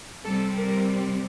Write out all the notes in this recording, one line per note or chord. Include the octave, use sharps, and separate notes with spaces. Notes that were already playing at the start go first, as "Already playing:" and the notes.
C3 G3 C4 A4
A#4